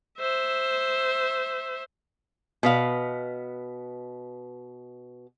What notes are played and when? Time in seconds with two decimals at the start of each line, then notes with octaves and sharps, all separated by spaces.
0.18 C5 E5
2.63 B2 B4 F5